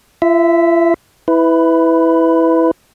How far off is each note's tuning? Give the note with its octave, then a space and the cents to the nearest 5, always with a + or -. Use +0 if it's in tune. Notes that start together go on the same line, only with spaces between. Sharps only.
F4 -45 E5 +0
E4 -10 B4 +15